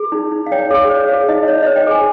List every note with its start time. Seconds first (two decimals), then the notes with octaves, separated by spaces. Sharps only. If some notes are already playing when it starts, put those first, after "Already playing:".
Already playing: G#4
0.12 D#4
0.32 D#4
0.46 F5
0.52 C#5 G5
0.71 G#4 F5
0.90 C5 C#5
1.09 G#4 F5
1.28 D#4 D#5
1.48 D#4 C#5
1.63 C5 D#5
1.76 G5
1.87 G#4 G#5